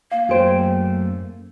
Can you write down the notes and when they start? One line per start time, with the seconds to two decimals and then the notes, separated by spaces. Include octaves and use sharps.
0.12 A#3 F5
0.29 F#2 A3 G#4 C5 G5